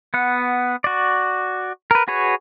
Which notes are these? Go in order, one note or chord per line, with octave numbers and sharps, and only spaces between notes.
B3 F#5
F#4 D5
A#4 B4
F#4 G#4 B4 C#5